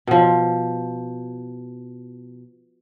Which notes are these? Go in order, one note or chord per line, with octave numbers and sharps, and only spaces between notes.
B2 F3